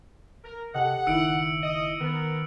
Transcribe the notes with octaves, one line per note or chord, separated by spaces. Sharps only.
A#4
C3 G4 A4 D#5 F#5
F#1 D#3 E4 E6 C#7 D7
D#5
D#3 B3 A#4